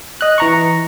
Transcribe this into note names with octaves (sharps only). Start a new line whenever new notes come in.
D#5 F#6
E3 A#5 C#6